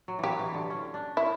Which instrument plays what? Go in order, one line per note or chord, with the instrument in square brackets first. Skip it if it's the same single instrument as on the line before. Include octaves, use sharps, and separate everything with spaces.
[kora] F#3
[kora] E3 F#3 [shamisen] G4
[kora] E3
D3
C#4
D4
[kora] C#4 [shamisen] E4